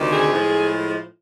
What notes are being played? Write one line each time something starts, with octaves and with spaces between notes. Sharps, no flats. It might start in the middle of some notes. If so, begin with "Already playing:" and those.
Already playing: D2 C3 D#3
G#4
A2 F3 G#3